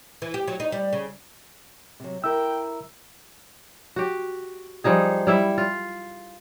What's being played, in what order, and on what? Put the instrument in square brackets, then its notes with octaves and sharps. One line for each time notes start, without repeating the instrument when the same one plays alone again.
[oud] E3
G4
F#3
D#4
G3
C#3
[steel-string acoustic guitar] C3 F#3
[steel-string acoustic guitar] E4 A#4 [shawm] G5 [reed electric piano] E6
[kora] F#4 G4
F3 G3 D#4 G#4
G3 E4 E5
F4